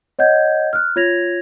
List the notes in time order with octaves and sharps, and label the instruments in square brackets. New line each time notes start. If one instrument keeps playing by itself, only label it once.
[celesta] C#5 D#5 F#5 G6 G#6
F6 F#6
F4 C#5 G#6 A#6 F7